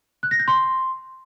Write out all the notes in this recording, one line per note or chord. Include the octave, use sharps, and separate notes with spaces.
F#6
A#6
G6
C6